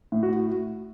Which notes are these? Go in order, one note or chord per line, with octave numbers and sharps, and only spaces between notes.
A2
F#4